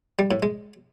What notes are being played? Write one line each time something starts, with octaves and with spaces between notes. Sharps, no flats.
G3
A2
G#3